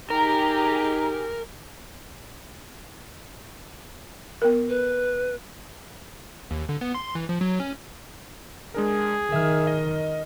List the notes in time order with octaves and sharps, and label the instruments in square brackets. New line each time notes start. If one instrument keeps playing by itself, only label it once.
[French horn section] D#4 [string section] G4 G#4 [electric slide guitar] A#4 [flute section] A#5
[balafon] B3 A#4
[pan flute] B4
[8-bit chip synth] D#2
D3
B3
C6
E3
F3
F#3
C#4
[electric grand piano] G#3 D4 A#4 [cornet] G#4
[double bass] D#3 [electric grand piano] E5 F6
[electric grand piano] D#5